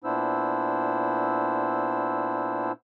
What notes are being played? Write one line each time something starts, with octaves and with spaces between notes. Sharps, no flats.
A#2 B3 D4 E4 C5 E6